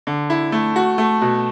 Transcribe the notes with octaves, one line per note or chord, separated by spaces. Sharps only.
D3
E4
A3
F#4
A3
B2